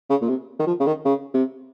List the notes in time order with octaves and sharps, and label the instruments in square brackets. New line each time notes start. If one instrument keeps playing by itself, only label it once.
[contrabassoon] C#3
A#2
C3
D#3
F3
C#3
D#3
C#3
C3